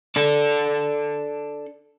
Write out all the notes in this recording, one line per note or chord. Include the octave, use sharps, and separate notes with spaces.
D4 A4